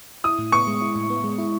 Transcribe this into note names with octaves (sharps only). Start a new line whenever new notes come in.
E4 D#6
A2
B3 C#6
G#3
E4
A2
B3
G#3
E4